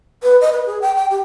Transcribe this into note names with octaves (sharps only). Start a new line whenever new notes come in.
B4
D#5
B4
G#4
G5
G5
G4